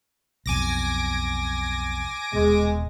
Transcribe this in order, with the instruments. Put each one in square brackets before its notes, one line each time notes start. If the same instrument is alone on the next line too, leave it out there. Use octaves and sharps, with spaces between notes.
[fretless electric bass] B1 F2 B2 [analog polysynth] G#5 D6 A#6
[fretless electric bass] D#1 B2 [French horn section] G#3